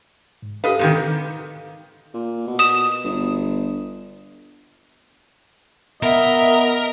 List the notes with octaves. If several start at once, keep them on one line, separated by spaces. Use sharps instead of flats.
G#2
G4 A4 B4 D#5 F5
G#2 C3 D#3
A#2
B2
D#6 E7
G1
B3 A#4 D#5 E5